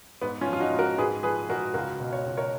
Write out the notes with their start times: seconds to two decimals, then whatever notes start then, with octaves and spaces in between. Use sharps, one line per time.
0.22 G#2 B3
0.41 C#4 F4
0.48 F3
0.53 F4
0.60 D#4 F#4
0.73 G#2
0.79 F#4 A#4
0.98 G#2 G#4 B4
1.23 F3 G#4 B4
1.49 G#2 F#4 A#4
1.74 C#2 F#4 A#4
2.00 B2
2.13 C#5
2.26 C#2
2.37 A#4 C#5